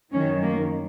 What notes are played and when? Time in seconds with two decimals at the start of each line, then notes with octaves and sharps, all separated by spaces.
0.13 F#2 D#3 F#3 C#4
0.43 A#3